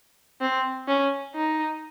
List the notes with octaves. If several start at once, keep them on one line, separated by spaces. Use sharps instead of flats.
C4
C#4
D#4